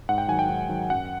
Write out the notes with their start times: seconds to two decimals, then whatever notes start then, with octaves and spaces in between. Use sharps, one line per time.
0.09 G#2 F#5
0.18 G5
0.28 D#3 F#3 G#5
0.39 G5
0.49 G#2
0.69 D#3 F#3
0.90 F#2 F#5